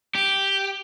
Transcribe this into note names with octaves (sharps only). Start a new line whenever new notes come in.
G4